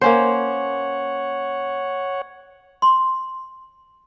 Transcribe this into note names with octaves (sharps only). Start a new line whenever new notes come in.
A#3 C#4 C5 C#5 F#5
C6